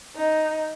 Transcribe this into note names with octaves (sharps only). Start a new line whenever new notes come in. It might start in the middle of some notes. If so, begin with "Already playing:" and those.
D#4